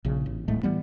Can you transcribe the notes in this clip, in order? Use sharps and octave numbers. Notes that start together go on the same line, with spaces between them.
A#1 C#3
A1
D1 A2 G#3 A3
A2 E3 G3 B3